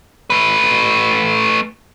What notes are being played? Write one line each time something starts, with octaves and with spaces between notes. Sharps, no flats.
A3 B4